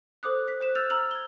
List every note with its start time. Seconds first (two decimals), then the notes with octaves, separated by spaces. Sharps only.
0.23 A4 C5 D6 D#6 F#6
0.48 F#6 B6
0.60 C5 F#6 E7
0.75 E6 F6 G6 A6 F7
0.90 A#5 E6 F7 F#7
1.11 G#6 G7